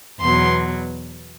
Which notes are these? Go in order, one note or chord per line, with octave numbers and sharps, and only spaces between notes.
E2 B2 F#3 C6